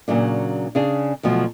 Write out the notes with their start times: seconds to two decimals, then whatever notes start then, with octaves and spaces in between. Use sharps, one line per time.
0.08 A#2 C#3 F#3 D4
0.75 C#3 D4 G#4
1.23 D2 B2 F3 F#3